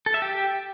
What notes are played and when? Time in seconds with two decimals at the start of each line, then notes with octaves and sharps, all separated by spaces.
0.06 A4
0.14 E5
0.22 G4